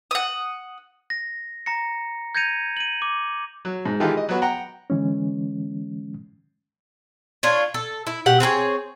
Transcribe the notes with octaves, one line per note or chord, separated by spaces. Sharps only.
F#5 D#6
A#6
A#5 A#6 C#7
G6 G#6 A#6 C#7 D#7 F7
D#7 F#7
D6
F#3
G#2
D#3 E3 G#3 F4 G4 A4
D#5
F#3 B3 F#4
F#5 G5 A#5
D3 E3 G#3 C#4
D4 F4 C#5
A4
E4
B2 G4 F#5
C4 G#4 A#4 C#5